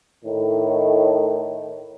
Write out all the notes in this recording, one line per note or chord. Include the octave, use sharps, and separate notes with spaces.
A2 D#3